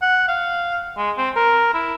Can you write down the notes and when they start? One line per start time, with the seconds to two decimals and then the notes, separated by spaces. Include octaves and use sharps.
0.02 F#5
0.28 F5
0.97 G#3
1.17 C4
1.36 A#4
1.74 E4